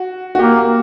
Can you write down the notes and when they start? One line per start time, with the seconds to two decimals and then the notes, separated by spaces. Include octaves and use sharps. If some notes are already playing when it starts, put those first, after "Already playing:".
Already playing: F#4
0.35 F#4
0.39 A#3 G4